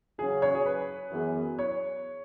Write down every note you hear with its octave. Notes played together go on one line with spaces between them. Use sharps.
C#3 F#3 C#4 G#4
C#5
G#4
B4
F#2 E3 B3 G#4
C#5